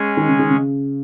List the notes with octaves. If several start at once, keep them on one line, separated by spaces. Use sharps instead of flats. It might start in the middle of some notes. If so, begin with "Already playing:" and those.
Already playing: G#3 C#4 G#4
D#3
C#3
D#3
C#3